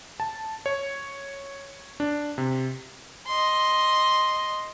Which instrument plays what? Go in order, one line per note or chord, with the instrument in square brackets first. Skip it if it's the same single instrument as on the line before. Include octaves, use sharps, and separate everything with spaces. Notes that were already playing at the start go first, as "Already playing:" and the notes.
[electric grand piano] A5
C#5
D4
C3
[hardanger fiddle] D#5 C6